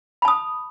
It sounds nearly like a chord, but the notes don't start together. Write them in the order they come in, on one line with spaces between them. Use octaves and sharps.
B5 A5 D#6